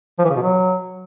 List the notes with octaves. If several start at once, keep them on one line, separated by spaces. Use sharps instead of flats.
F3
E3
C#3
B2
F#3